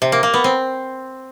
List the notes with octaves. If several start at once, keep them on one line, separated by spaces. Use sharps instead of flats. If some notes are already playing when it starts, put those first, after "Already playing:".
C3
A#3
A#3
B3
C4